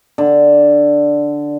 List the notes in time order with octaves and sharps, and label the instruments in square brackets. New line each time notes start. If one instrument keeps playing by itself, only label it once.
[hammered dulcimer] D3